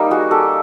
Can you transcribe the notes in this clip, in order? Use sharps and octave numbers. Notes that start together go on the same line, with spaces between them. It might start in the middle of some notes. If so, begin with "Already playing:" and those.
Already playing: G3 A#3 D#4
F#4 G#4
G4 A4